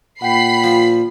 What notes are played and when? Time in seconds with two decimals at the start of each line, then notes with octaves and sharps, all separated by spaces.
0.22 A#2 F#5 G5 B5 B6 C7
0.64 F3